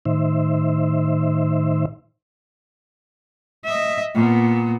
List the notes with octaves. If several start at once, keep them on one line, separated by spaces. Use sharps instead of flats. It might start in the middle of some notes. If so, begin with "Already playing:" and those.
A2 D#3 D#4 C5 E5
D#5 E5
A#2 B3